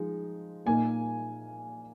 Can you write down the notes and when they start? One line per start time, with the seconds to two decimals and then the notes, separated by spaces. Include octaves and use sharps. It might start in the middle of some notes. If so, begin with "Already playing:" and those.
Already playing: F3 G#3 D#4
0.66 A#2 A#3 D#4 G#5